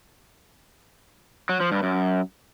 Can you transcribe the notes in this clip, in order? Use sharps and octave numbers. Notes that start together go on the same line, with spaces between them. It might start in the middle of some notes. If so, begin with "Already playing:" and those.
F#3
F3
G2
F#2